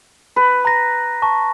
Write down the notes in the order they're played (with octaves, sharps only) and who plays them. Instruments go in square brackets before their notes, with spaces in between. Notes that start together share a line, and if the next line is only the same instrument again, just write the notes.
[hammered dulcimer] B4
[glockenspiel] A#5 A#6
A5 C#6